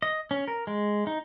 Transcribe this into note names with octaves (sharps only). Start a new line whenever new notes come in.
D#5
C#4
A#4
G#3
D#4